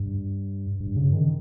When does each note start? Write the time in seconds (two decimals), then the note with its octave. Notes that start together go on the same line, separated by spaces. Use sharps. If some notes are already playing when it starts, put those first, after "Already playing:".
Already playing: G2
0.80 G2
0.96 C#3
1.13 D#3